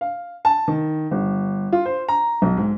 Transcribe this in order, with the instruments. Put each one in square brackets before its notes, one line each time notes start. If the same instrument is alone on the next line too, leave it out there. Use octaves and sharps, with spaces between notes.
[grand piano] F5
A5
D#3
G1
F4
C5
A#5
B1
G#2